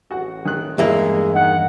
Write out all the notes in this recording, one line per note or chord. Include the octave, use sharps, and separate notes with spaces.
A1 F#4 F#5
D#3 F#6
E2 G2 G3 G#3 A#3 E4
D#3 F#5